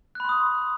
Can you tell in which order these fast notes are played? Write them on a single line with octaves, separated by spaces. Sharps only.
F#6 B5 C6 D#6